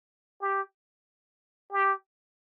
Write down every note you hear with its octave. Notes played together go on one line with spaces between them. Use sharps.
G4
G4